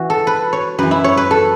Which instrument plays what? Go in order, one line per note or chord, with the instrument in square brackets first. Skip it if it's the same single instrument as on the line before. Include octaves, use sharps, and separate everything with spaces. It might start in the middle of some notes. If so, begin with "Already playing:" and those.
Already playing: [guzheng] E3 F#4
A4
B4
C#5
F#2 E3 B4
E4
C#5
B4
A4